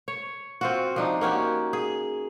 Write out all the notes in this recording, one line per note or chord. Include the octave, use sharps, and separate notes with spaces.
C#5
C4 F4 F#4
F3 D4 D#4
A#3 C#4 F#4 G4
G#4